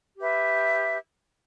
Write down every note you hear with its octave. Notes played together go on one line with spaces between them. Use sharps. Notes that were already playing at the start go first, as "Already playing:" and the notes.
G4 B4 E5